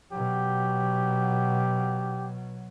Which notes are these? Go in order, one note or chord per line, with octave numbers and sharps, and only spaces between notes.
B2 F#3 G4